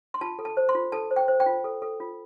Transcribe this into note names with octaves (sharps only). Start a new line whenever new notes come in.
C6
F4 A5
A4
A5
C5
C6
F4
A4 A5
C5
G5
C5
G5
F4
A4
A4
F4